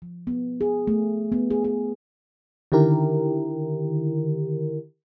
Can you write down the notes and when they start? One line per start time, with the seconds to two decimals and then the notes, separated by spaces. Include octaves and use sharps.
0.02 F3
0.27 B3
0.61 G#4
0.87 A3
1.32 B3
1.50 G#4
1.64 G#4
2.72 D3 D#3 E4 G4 A#4